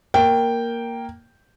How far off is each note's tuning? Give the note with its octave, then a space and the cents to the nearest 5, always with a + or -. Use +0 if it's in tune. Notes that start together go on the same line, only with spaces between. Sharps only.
A#3 +0 G5 +0